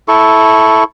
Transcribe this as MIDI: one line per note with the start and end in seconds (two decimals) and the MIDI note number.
0.08 0.84 64
0.08 0.84 69
0.08 0.84 85